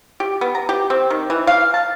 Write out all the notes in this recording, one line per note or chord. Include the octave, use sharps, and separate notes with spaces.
G4
B3
A#5
G4
C4
D#3
E3
F5
A5